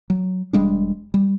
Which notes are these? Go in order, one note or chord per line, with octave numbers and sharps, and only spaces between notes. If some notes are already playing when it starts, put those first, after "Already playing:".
F#3
E1 G3 G#3 D4
G3